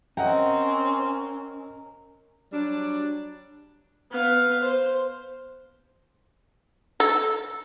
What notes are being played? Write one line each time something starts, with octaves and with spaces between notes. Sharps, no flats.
C4 C#4 A#4 D#5 F#5 G5
F#3 G3 D4
B3 F5
C5
A4